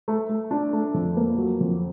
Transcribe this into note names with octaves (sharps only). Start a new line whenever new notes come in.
A3
A3
D4
A3
F2
A#3
F#3
F2